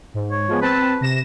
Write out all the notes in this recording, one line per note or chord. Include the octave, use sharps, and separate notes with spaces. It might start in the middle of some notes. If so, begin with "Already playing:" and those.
G#2
C#5
F3 G#3 B3
C4 B4 A5
C3 A#6 E7